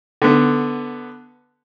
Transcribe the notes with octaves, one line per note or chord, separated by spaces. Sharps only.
D3 B3